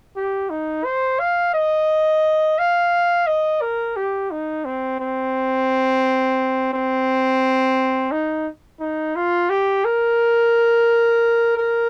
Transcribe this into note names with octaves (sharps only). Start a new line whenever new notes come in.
G4
D#4
C5
F5
D#5
F5
D#5
A#4
G4
D#4
C4
C4
C4
D#4
D#4
F4
G4
A#4
A#4